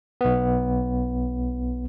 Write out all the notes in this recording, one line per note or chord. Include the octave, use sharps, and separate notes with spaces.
B1 B3